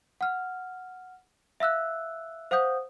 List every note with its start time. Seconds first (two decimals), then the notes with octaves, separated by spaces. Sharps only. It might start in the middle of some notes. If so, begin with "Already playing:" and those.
0.21 F#5 F6
1.60 E5 F5 E6 F#6
2.51 C5 F5 F#5 D#6 G6